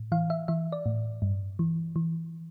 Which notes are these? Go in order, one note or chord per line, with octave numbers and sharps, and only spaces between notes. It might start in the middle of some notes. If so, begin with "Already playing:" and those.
Already playing: A2
E3 F5
E5
E3 E5
D5
A2
G2
E3
E3